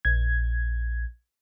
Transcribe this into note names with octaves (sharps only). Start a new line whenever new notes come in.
A#1 G#6